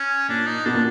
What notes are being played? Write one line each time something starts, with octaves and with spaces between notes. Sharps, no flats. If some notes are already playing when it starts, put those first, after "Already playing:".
Already playing: C#4
A#2 D4
D#4
B2 D4
A#2